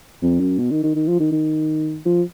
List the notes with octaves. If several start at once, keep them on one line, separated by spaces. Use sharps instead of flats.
F2
F#2
B2
D#3
D#3
D#3
F3
D#3
D#3
F3